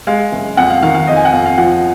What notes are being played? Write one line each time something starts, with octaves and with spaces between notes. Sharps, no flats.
G#3 F5
F#1
F2 F#5
F5
D#3 F5
F5
F2 D#5
G#5
F#5
F2 F5
F5
F3 F#5